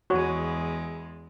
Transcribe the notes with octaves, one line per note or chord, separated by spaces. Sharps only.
E2 G#3 F#4 C#5